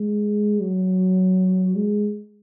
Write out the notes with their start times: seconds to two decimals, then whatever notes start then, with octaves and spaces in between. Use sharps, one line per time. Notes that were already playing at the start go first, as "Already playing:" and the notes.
Already playing: G#3
0.61 F#3
1.75 G#3